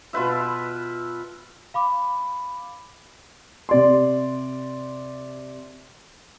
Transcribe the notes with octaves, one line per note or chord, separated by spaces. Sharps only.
B2 F4 B4 E5
F5 B5 D6
C3 D5 C6